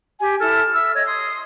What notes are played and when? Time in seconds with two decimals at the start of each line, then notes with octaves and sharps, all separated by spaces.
0.20 G4 G#5
0.39 E4 A4 F6
0.73 E5 E6 F6
0.93 C#5 D#5
1.06 C6 D#6